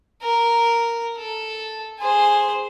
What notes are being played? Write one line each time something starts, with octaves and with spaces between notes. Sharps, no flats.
A#4
A4
G#4 C5